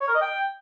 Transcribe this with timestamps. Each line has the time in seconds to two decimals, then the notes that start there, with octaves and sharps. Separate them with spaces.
0.01 C#5
0.08 A#4
0.15 D#5
0.22 G5